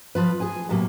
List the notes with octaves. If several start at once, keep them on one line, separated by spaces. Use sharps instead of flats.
F3 F4 B4
G#4 G#5
A2 C3 F#3 A#3